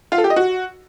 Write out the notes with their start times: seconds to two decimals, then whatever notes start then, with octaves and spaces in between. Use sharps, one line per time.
0.12 F4
0.18 A4
0.24 G4
0.30 D#5
0.36 F#4